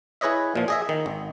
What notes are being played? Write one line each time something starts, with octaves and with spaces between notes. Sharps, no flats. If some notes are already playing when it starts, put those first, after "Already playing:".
E4 G#4 B4 C#5 D#5 E5
A#2 F3
G#4 D#5 E5
D#3
G#1